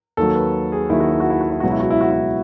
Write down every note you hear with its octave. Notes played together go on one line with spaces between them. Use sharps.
D#2 D#3 F#3 A4
B4
G#4
D#2 D#3 F#3 E4
F#4
E4
F#4
E4
F#4
E4
C#2 B2 F#3 F#4
E4
F#4
E4
F#4
E4